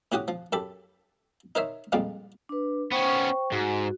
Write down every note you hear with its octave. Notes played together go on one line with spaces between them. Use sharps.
A2 C#4 F#4 G4 F#5 D#6
F3
F#2 G4 A4 B5
D#4 A#4 C5 C#5 E5
F2 A#2 F3 G3 G#3 A#3
D4 B4
B3 C#4 C5 G5 C#6
G#2 F#4